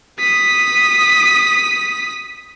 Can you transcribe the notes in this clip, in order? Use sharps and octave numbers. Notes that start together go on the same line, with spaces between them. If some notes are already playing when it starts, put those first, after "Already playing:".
D#6 B6